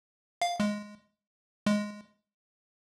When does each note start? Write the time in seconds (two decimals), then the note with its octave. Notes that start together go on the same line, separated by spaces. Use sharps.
0.42 F5
0.60 G#3
1.66 G#3